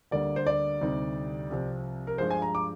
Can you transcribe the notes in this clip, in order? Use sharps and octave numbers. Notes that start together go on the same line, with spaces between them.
D2 D3 G3 A#3 D5
C5
D5
D2 C3 G3 C4 D#4
C2 C3 F3 C4
A#4
G2 F3 G#3 C5
G#5
A#5
D6